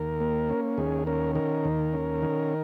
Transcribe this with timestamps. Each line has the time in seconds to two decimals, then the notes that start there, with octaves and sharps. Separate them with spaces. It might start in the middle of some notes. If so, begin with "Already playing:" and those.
Already playing: D#2 A#4
0.20 A#3
0.49 C#4
0.78 D#2 G#4
1.07 C#4 A#4
1.35 D#3 A#4
1.65 D#2
1.93 C#4
2.22 D#3